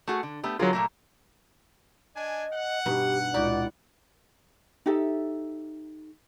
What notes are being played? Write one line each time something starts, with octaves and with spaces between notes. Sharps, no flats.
A3 F#4 G#4
D3
A3 B3 G4
D3 F#3 F4 G#4 A#4
A#2 A3 A#3 A#5
D4 D#5 G#5
F#5
G2 B2 D#4 G4
C#2 A#2 D#4 E4 F#4 G4 D5
D#4 G4 A4 E5